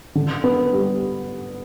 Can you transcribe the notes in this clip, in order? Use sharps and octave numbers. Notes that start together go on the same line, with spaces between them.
D3
B3
G3